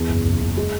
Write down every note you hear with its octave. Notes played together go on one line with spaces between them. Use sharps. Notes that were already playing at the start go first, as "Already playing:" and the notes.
Already playing: E2
F#1
F#1
F#1
G#3